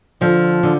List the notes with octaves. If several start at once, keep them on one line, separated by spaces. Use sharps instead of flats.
D3 F3
D3